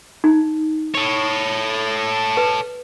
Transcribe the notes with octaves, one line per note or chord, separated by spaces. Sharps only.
D#4
A4 C#5
B4